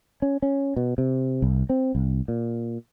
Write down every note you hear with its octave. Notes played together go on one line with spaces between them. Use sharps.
C#4
C#4
B2
C3
C2
C4
C2
A#2